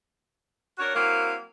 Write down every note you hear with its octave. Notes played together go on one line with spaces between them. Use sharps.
D4 F#4 A#4 C#5
F#3 A#3 C4 E4 F5